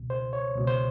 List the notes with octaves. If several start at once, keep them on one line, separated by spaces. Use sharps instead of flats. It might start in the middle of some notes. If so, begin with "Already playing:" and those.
Already playing: C#2 B2
C5
C#5
C#2 B2
C5